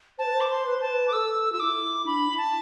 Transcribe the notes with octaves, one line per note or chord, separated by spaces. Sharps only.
C5 A5
B4
C5
D6
C6
B4
C5 A5
B4
D6
A4 E6
F4 E6
E4 D6
D4 B5
E4
A5